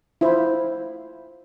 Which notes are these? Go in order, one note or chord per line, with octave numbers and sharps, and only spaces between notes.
E4 F4 C5